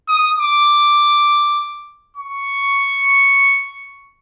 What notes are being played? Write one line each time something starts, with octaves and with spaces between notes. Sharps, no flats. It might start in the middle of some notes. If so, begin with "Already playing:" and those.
D#6
D6
C#6